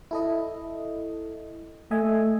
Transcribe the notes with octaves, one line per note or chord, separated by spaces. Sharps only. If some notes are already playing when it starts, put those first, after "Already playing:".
E4 A4 D#5
A3 D#5 E5 G#5